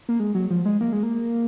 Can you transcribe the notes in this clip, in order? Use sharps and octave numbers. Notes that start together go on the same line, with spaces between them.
A#3
G#3
F#3
F3
G#3
A#3
G#3
A#3